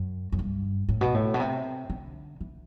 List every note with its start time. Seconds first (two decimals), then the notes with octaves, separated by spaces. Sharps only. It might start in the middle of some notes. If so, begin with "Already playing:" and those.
Already playing: F#2
0.32 F#2
0.39 G2
0.89 A2
1.01 B2
1.14 A2
1.34 B2
1.40 C3
1.90 D3
2.41 E3